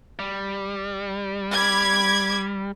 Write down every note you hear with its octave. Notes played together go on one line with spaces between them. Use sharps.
G3
B5 D6 G#6